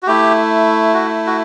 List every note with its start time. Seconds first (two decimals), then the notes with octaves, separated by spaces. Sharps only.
0.03 F#4
0.07 A3 E4 G4
0.94 F#4
1.27 F#4